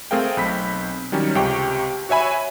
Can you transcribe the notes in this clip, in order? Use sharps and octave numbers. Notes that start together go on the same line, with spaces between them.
A3 C4 G#4 A#4 F5 G5
B1 C4 B5 B6
D#3 F#3 G3 C#4
C#2 C3 G4 G5 C#6
F#4 C#5 E5 G#5 B5